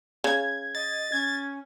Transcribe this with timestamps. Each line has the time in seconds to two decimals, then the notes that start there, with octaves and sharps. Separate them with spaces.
0.24 C#3 G#6
0.75 D#5 A6
1.12 C#4 G#6